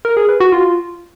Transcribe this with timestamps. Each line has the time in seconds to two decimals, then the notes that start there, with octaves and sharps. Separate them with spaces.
0.05 A#4
0.17 G#4
0.29 B4
0.40 F#4
0.52 F4